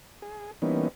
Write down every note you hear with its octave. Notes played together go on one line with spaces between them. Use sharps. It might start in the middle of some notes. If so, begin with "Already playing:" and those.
G#4
E3 G3 A#3 B3 C#4 D#4